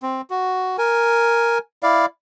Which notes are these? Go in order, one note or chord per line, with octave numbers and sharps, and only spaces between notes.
C4
F#4
A#4 G#5
E4 D5 F5